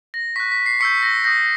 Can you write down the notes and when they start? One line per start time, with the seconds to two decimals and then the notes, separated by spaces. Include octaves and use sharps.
0.14 A#6
0.36 C#6 F#6 B6
0.52 B6
0.66 C7
0.80 C#6 E6 G6 B6 C#7
1.03 A#6
1.24 D#6 G6 A#6